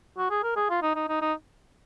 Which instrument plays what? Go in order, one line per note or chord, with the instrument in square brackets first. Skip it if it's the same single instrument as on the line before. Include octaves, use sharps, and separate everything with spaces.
[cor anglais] F#4
G#4
A#4
G#4
F4
D#4
D#4
D#4
D#4